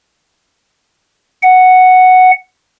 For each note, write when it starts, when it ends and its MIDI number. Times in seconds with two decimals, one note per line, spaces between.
1.43 2.31 78